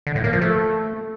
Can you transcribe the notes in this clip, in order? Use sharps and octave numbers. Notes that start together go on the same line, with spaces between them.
D3
A2
A#3
F3
A3